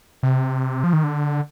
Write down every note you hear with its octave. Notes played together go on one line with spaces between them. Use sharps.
C3
F3
D#3
D3